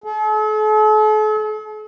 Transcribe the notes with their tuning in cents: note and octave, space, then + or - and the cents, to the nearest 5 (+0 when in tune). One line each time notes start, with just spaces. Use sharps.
A4 -45